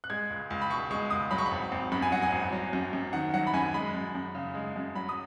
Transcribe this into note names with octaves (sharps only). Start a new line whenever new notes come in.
F#6
G#3 G#6
C#2
C#2
B5
B2 C#6
G#3 C#6
C#2 D#6
F#3 B5
C#6
B5
G#1
G#1
F#2 B5
G#5
F#3 F#5
G#5
G#1
F#3
F#2
F#2
D#3 F#5
F#3 F#5
B5
F#2 G#5
G#3 B5
F#2
F#2
C#3
G#3
F#2
F#3 B5
D#6